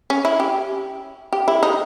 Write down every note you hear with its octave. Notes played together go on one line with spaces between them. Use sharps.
C#4
E4
G4
G4
E4
D#4